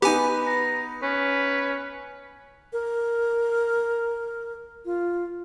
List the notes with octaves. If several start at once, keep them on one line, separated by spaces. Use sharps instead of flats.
B3 D#4 G4 B4 G#5
A#5
C#4 B4
A#4
F4